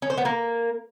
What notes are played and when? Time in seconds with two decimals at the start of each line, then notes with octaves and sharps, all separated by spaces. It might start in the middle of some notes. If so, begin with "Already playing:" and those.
0.02 C#4
0.10 C5
0.18 B3
0.25 A#3